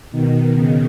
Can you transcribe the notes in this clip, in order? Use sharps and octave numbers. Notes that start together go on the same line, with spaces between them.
B2 D#3
C#3